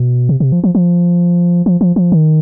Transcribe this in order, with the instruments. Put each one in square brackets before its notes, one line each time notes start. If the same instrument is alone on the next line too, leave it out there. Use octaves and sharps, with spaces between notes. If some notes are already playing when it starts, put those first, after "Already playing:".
Already playing: [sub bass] B2
C3
C3
F3
F3
F3
F3
F3
F3
D#3